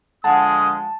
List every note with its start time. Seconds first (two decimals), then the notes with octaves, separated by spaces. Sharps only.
0.24 D3 F3 G#3 F#5 A5 D#6